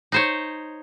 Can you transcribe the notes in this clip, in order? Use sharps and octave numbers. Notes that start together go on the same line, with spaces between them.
D#4 C5 C#5